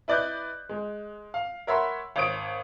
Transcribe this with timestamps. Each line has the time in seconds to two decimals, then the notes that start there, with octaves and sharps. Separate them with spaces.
0.08 E4 B4 D5 D#5 F#6 G6
0.69 G#3
1.34 F5
1.67 A#4 C#5 E5 F#5 B5 C6
2.16 G#1 C#5 D#6 D7